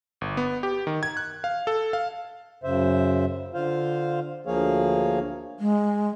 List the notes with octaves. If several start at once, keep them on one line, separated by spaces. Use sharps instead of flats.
G1
B3
G4
D#3
G#6
F#6
F5
A4
F5
F#2 C#3 C5 E5
D3 F4 C5 F5
D2 F3 A#3 G#4 C#5 F5
G#3